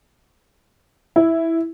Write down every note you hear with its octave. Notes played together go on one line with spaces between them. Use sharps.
E4